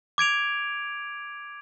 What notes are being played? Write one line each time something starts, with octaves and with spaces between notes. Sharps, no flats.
D6 G#6 D7 F7